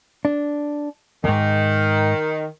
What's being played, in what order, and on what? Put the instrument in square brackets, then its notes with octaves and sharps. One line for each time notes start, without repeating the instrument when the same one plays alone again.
[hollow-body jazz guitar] D4
[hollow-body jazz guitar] E2 G#2 [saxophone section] D#3